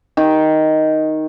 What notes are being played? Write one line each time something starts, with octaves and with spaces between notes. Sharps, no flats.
D#3